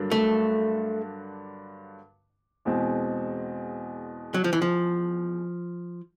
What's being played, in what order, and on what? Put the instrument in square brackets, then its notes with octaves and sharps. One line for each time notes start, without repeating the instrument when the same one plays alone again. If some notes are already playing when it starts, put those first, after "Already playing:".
Already playing: [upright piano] G2 D3 F#3 A#3 D4
[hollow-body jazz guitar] A3
[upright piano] E2 B2 G#3 C4
[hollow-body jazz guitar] F#3
F3
E3
F3